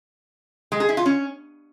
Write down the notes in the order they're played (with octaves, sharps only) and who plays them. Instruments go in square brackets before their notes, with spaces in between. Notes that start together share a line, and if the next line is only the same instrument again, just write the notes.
[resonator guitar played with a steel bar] G#3
G#4
E4
F4
C#4